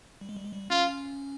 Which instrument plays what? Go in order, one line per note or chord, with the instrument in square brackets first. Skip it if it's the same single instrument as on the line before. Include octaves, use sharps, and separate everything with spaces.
[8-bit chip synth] G3
G#3
G3
G#3
G3
[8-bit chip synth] C#4 [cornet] F4